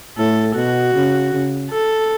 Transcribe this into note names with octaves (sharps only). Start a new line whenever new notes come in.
A2 A4
B2 F#4
C#3
C#3
A4